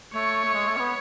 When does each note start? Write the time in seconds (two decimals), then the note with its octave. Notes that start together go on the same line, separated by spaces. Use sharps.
0.14 A3 C#5
0.45 A3
0.54 G#3
0.68 A3
0.77 C#4
0.80 B3